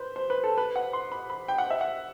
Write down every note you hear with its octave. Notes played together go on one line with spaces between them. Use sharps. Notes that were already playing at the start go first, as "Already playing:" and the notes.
Already playing: B4 C5
C5
B4
A4
B4
F#5
C6
B5
B5
G5
F#5
E5
F#5